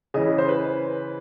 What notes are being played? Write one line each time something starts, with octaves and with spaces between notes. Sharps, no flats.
C#3 E3 D#5
C5
B4